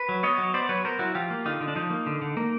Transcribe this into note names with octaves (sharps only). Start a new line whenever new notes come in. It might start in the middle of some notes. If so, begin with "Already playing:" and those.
Already playing: B4
F#3
B3 C#5 D#5
F#3
B3 C5 D5
F#3 B4 C#5
B3 A#4 C5
F#3 E4 F#4
F3 F4 G4
A#3
D3 D#4 F4
D3
D4
F3 D#4
A#3
D3
D3
A#3